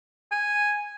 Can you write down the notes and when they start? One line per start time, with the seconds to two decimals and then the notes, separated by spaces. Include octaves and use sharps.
0.31 G#5